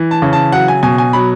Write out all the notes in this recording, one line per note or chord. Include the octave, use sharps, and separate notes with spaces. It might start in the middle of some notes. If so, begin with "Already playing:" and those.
Already playing: E3
A5
C#3
A5
F#3 F#5
G#5
B2 G#5
G#5
F#3 B5